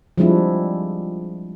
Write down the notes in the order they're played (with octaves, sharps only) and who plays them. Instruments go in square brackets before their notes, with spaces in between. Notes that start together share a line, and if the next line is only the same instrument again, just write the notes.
[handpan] F3 G3 G#3 C4 D4 E4